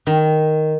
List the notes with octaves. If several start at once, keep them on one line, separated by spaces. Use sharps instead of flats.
D#3